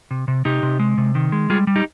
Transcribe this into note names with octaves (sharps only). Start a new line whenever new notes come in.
C3
C3
C3 D#4 G4
C3
G#3
C3
D#3
G#3
G3 F4 G#4
G3
D#4 G4